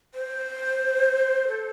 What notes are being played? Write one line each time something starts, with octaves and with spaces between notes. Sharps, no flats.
C5
A4